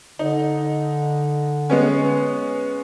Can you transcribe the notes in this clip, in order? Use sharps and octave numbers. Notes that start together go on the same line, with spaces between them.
D3 D#4
G#3 B3 C#4